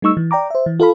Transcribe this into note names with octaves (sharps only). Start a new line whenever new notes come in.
G3 A3 D#4 C#6 E6
E3
D5 G5 A#5 D6
C5 E5
E3
F4 A4 F5 B5